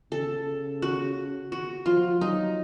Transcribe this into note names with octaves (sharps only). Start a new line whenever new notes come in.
C#3 A4
F#4
F#4
F3 F4
F#3 D#4